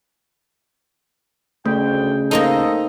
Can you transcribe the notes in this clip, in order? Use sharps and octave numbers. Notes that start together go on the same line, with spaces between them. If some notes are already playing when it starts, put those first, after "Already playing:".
D2 C#3 A3 G5
A#3 C4 D#4 A4 D#5